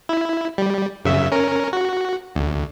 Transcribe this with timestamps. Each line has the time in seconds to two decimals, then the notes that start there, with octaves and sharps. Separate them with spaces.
0.09 E4
0.58 G3
1.05 F#2 C#3 E5
1.32 C#4 A#4
1.73 F#4
2.35 D2